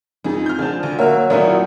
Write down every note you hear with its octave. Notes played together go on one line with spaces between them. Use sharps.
F2 D#4 G#4
F6 G6
D3 F3 C4 G#4 A5
D2
F#3 A#3 E5 F6
G#1 A#2 F#3 A3 E4 D#5